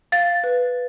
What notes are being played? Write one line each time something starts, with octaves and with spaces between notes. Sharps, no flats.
F5 A6
B4